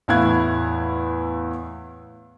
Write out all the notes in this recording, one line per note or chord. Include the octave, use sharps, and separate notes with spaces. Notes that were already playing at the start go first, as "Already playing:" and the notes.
E2 A2 E4 F5 F#6 G#6